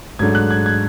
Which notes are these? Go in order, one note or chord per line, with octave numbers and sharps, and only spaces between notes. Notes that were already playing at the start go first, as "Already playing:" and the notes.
G#2 F#3 A3 D4 G#6
F#6
G#6
G#6